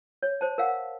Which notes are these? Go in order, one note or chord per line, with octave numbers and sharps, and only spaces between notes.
C#5
C5 A5
A#4 F5 F#5